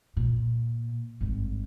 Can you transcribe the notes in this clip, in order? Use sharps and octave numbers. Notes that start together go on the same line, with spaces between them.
A#2
G#1 G2